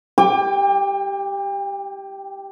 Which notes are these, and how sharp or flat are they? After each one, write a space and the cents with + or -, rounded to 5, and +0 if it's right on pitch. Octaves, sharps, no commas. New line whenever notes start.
G4 +0 G5 +35 D6 +0